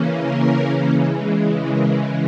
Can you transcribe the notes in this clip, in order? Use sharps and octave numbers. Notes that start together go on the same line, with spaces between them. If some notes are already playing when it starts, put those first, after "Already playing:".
Already playing: C#3 E3 A#3 C#4
A#4
C#3 E3 G#3
A#4